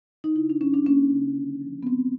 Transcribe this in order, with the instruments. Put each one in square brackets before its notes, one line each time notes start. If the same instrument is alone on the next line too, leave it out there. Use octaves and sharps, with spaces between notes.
[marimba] D#4
C#3 E4
D4
F#3 C#4
D4
A#3 C#4
C#3
D3
F3
B3
G#3 C4